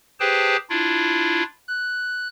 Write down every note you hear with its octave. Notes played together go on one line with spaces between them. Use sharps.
G4 G#4 B4 C5 G5 A5
D4 E4 F4
F#6